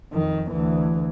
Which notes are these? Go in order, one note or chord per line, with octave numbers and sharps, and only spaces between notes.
F2 D#3
D2 E3